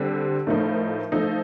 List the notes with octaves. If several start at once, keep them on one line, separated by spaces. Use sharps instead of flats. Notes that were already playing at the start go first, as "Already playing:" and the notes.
Already playing: D3 G3 C4 G4
A2 F3 A3 D#4 A#4
F3 A3 D#4 A4